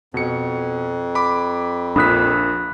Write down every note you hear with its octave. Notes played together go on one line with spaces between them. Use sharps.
F2 B2 C#7
B5 D6
A#1 A#2 D4 B5 D#6 F#6 B6